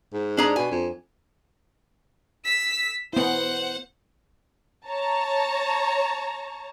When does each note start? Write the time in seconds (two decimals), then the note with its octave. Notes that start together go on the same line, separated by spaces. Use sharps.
0.13 G#2
0.37 D4 G#4 A#5
0.56 B2 G#5
0.71 F2
2.44 E6 B6
3.13 B3 E4 C5 F#5
4.87 C#5 A5 A#5